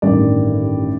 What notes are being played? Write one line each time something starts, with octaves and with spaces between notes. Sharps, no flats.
A1 G2 D#3 G3 D5